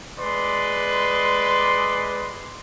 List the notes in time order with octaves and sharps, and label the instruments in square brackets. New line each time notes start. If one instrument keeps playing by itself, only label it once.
[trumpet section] G#3 B4 D5 C6